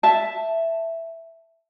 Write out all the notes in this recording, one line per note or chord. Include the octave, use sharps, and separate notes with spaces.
E5 A5